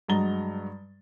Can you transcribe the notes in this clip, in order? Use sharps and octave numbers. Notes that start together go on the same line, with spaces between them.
G2 F#3 G#3 A#5 A6 G7